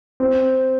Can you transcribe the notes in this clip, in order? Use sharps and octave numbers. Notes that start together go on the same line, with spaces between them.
C4